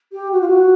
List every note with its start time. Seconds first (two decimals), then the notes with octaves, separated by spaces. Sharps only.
0.12 G4
0.32 F#4
0.40 F4
0.47 F#4